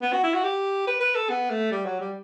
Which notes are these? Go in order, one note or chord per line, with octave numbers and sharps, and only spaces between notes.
B3
F#4
E4
F#4
G4
B4
B4
A4
B3
A3
G3
F#3
G3